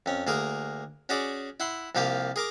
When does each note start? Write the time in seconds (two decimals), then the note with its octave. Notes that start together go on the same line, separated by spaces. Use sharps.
0.06 F2 C#4
0.27 D2 A#3 G#4 A#4
1.09 C#4 F#4 G#4 D5
1.60 E4 F#5 C6
1.95 C2 F3 A#3 G4 F5
2.36 G#4 A#4 D6